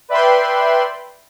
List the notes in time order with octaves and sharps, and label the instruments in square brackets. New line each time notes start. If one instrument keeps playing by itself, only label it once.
[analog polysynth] B4 D5 E5 G5 B5 C6